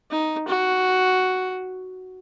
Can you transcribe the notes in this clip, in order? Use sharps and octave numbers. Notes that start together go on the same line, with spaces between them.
D#4
F#4